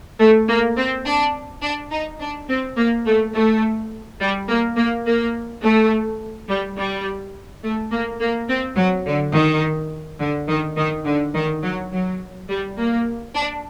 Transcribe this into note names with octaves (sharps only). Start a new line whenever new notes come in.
A3
A#3
C4
D4
D4
D#4
D4
C4
A#3
A3
A3
G3
A#3
A#3
A#3
A3
G3
G3
A3
A#3
A#3
C4
F#3
D3
D#3
D3
D#3
D#3
D3
D#3
F#3
F#3
G3
A#3
D4